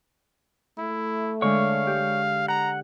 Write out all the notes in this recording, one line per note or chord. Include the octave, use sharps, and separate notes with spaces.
A3 E4
D3 G#3 D4 C#5 F5 C#6
G4
F#5 A#5